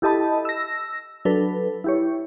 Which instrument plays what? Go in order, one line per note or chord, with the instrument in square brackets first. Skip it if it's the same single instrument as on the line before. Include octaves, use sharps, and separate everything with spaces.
[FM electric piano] E4 G4 A4 D#5 A5 B5
E6 A#6
F#3 D4 A4 B4
E4 G4 C#5